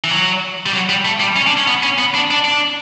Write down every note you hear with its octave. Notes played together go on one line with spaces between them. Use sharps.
E3
F#3
G3
F#3
G3
A3
G3
C#4
D4
C#4
B3
C#4
B3
D4
D4
D4